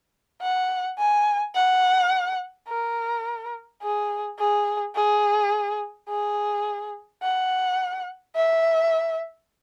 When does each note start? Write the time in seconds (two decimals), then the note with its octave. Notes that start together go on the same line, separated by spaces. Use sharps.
0.42 F#5
0.99 G#5
1.55 F#5
2.69 A#4
3.82 G#4
4.40 G#4
4.95 G#4
6.09 G#4
7.23 F#5
8.36 E5